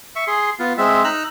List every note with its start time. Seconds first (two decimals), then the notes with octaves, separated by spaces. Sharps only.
0.16 E5 C#6
0.27 G#4 C6
0.59 B3 F4
0.78 G#3 C4 E5
1.04 D#4 A#5 E6 F#6